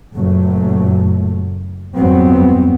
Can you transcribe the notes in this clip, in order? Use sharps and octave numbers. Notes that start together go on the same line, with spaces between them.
F#1 F#2 A#2 F#3 A3
G1 F2 G#2 F#3 B3 C4